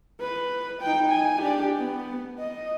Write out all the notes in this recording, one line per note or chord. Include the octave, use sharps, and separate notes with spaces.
B4
D#4 G5
G#5
D4 G4
B3
D#5